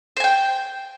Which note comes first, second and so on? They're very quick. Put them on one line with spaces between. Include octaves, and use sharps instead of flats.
C5 G#5 G5